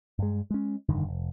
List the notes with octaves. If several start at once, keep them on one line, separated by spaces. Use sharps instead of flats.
G2 G#3
G#3 C#4
F1 G2 D3 D#3
F1